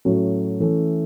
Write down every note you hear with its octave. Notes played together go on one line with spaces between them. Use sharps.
A2 F#3 A3 C#4
E3 A3 C#4